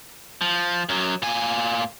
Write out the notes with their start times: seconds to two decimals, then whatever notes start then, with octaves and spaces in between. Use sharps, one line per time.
0.41 F3
0.89 F#2 F#3
1.22 A#2 G#5